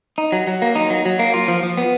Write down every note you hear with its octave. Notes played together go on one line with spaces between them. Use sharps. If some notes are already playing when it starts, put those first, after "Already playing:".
D#4
F#3
F#3
A#3
D#4
F#3
F#3
A#3
F4
F3
F3
B3